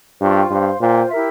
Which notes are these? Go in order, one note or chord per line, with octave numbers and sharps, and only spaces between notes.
G2 F4 C5 G5 C#6
G2 C5 F5 C6
A#2 F4 C5 G5
E4 G4 A#4 E5